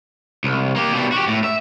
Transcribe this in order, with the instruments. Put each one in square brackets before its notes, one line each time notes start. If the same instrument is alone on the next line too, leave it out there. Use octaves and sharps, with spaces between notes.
[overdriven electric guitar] C2
A#3 G4
B2 G3
F#4 G4
A2
E5